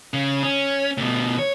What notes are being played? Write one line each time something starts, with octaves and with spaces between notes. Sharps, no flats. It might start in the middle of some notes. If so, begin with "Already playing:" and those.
C#3
C#4
D2 B2
C#5